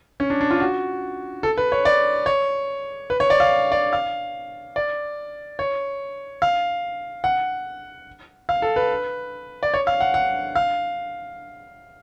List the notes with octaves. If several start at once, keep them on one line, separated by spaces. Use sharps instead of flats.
C#4
D4
D4
F4
F#4
A4
B4
C#5
D5
C#5
B4
C#5
D5
F5
D5
F5
D5
C#5
F5
F#5
F5
A4
B4
D5
C#5
F5
F#5
F#5
F5